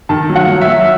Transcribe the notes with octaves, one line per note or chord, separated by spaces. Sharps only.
D#3 A5
F#3
F#5
F#3
E5
F#3